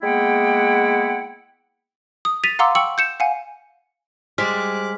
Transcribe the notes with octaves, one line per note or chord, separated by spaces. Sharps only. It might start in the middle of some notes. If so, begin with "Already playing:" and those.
G#3 A#3 B3 E4 F#5 G5
D#6
A6 B6 D#7 F7
F5 F#5 A#5 C6 D6 E6
G5 C#6 E6 C#7 F#7
G6 C#7 E7
F5 F#5 G#5
G3 G#3 C5 D6 F6 F#6 B6